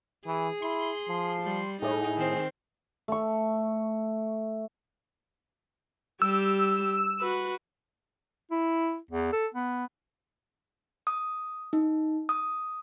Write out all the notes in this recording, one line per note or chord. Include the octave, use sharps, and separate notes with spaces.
E3 G#4
E4 C6
F3
G3
A2 D#4 G#4
D#3 C4
A3 C#6
G3 G4 E6
F#4 B4
E4
E2
A4
B3
D#6
D#4
D#6